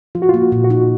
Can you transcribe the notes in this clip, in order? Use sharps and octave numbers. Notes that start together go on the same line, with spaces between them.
F3 F4
F#4
F4
A#3
A#2
F#4
D#4